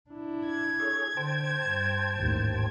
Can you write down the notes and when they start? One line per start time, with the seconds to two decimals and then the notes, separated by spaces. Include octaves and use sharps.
0.10 D4 E4
0.46 G#6
0.80 G#4 A4 C#5
1.17 D3 C5 G5 A5
1.66 G2
2.17 A1 D#2 G#2